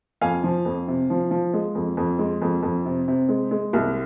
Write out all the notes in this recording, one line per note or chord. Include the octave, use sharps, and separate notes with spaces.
F2 F5 G#5
F3
F2
C3
F3
F3
G#3
F2
F2
G#3
F2
F2
C3
C3
G#3
G#3
C2